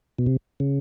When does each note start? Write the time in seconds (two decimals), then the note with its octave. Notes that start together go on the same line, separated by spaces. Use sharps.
0.19 B2
0.26 C3
0.60 C#3